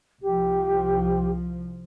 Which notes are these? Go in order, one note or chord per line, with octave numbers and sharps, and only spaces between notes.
C2 F3 G4